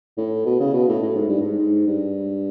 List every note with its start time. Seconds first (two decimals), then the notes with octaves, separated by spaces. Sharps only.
0.17 A2
0.46 B2
0.60 C#3
0.73 B2
0.88 A2
1.02 A2
1.15 G#2
1.29 G2
1.41 G#2
1.58 G#2
1.87 G2